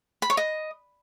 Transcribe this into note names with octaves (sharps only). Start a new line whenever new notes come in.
B5
C#5
D#5